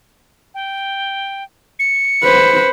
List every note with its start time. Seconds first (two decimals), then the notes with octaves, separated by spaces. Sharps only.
0.54 G5
1.79 C#7
2.24 B4 C5